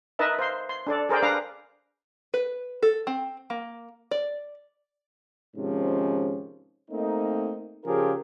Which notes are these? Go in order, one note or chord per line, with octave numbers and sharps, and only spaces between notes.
D#4 A#4 B4 D#5 E5 A5
C5 F5 C6
C6
D4 A4 D5
G#4 A#4 C5 D5 G5
D4 B4 F5 A#5 D6
B4
A4
C4
A#3
D5
G#2 C3 D#3 F3 C#4
A3 A#3 C4 D#4
C#3 F3 F4 G4 G#4 A#4